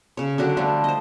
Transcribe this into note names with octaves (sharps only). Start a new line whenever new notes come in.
C#3 C#5
D3 F#3 F#4 G4
F3 G3 A3 F4
C5 D#5